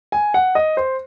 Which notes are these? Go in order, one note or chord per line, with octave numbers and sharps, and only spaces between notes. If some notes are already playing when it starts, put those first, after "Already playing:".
G#5
F#5
D#5
C5